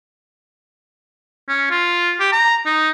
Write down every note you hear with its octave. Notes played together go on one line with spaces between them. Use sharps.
C#4
F4
G4
A#5
D#4